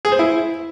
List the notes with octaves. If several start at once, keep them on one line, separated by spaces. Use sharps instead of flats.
G#4
C5
E4